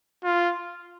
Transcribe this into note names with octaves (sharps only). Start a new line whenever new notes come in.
F4